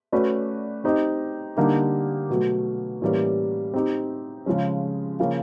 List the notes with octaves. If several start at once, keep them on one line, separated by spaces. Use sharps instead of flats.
A3 C#4 F#4 B4 D5
C4 D#4 G4 C5 D#5
D3 G3 A#3 D#4 G4
B2 F#3 A3
A2 E3 G3 A#3 C#4
C4 D#4 G4
C#3 F3 G#3 C#4
C#3 F3 A#3 C#4